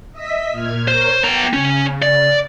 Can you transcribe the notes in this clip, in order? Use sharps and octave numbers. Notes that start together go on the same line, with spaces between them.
D#5 E5 B6
A#2 F6 G#6
A#4 C5 C#5
B3 G5 A#5
C#3 C#4
D5